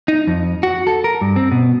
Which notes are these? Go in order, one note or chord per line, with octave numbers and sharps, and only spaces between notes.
D#4
F2
F#4
A4
A#4
G2
C4
B2